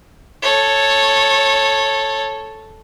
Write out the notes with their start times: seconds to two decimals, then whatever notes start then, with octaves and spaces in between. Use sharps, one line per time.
0.42 A4 C#5